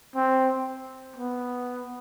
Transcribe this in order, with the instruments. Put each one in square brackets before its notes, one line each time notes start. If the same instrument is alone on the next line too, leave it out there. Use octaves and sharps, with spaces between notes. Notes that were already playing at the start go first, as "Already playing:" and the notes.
[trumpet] C4
B3